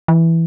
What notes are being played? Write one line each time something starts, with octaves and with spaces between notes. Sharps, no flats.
E3